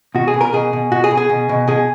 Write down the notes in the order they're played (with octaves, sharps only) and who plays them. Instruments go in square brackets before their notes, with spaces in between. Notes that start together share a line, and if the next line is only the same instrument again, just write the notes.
[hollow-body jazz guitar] B2 F#4
G#4
B2
A#4
B2 G#4
B2
B2 F#4
G#4
B2
G#4
B2
B2
B2 G#4